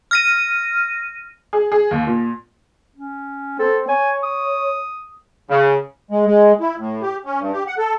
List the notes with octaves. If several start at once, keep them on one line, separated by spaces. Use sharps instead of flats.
F6 A#6 D#7
G#4
G#4
D#2
A#2
C#4
C4 A4
C#5 G#5
D#6
C#3
G#3
G#3
E4
A2
G4
C#4
G2
G4
F#5
A4